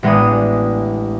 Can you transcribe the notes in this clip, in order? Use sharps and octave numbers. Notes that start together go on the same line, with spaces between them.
A1 G#3 B3 D4 D#6